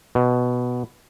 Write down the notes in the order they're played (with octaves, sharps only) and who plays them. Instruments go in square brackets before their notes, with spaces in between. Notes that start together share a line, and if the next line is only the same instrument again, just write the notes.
[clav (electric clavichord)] B2